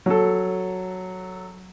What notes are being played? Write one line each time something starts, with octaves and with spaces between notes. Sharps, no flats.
F#3 A4